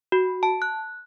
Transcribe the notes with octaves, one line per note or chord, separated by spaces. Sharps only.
F#4
A5
F#6